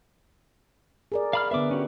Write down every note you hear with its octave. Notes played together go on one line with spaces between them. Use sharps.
G#4 A#4 D5
F5 B5 F6
D3 B3 B4 E5 D6
C#4 F#4 G4